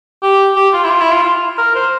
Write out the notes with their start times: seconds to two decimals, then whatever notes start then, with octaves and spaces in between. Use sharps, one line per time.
0.23 G4
0.56 G4
0.73 F4
0.84 E4
0.90 F4
1.01 E4
1.12 F4
1.23 F4
1.58 A#4
1.75 C5